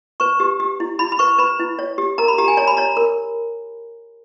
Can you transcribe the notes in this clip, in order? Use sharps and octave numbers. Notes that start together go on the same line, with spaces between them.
B4 C#6
G4
G4
E4
E4 B5
B5
B4 C#6
B4 B5
E4
C#5
G4
A#4 A#5
B5
G4 A#5
G#5
C#5 A#5
B5
C#5 A#5
A#4